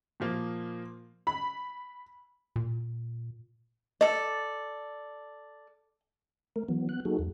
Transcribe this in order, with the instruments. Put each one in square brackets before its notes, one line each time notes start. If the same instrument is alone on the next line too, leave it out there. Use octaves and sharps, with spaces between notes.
[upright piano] A#2 F3 A#3
[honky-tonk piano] B5
[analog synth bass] A#2
[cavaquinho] A4 D5 [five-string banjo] D#5
[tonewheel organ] A3 A#4
E3 F#3 B3
B3 F#6
F#3 A#3 D#4 F#4 G#4 A4
E2